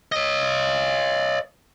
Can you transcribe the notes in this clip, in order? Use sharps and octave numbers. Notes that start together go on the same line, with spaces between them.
C#5 D#5